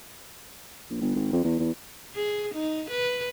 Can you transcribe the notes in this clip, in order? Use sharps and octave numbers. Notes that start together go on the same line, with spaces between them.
A#1
G1
G#1
F2
E2
E2
G#4
D#4
B4